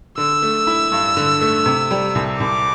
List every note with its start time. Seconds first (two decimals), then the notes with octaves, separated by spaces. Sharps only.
0.18 D3 E6
0.42 A3
0.67 E4
0.92 G2
1.17 D3
1.41 A3
1.66 C3
1.91 G3
2.15 C2
2.40 C2 D6